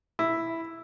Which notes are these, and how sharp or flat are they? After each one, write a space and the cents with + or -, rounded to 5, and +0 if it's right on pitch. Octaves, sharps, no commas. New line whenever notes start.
E4 +0